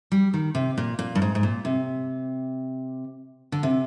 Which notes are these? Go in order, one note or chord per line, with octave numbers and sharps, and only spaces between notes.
G3
D#3
C3
A#2
A#2
G2
G#2
G#2
A#2
C3
D3
C3